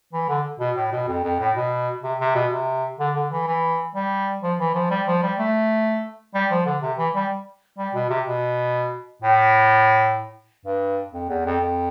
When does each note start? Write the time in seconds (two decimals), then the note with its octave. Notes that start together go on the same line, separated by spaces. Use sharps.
0.13 E3
0.29 D3
0.60 B2
0.77 A2
0.92 B2
1.08 F2
1.24 F2
1.40 A2
1.56 B2
2.03 C3
2.20 C3
2.35 B2
2.51 C3
2.99 D3
3.15 D3
3.32 E3
3.47 E3
3.95 G3
4.43 F3
4.59 E3
4.74 F3
4.90 G3
5.07 F3
5.22 G3
5.39 A3
6.35 G3
6.51 F3
6.66 D3
6.82 C3
6.98 E3
7.15 G3
7.78 G3
7.94 B2
8.10 C3
8.26 B2
9.22 A2
10.65 G2
11.13 F2
11.29 E2
11.45 F2
11.61 F2